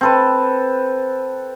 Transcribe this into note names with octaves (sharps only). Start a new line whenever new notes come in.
C4 A4 B4